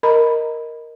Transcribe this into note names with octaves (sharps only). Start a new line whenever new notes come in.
A#4 D#5 A#5 B5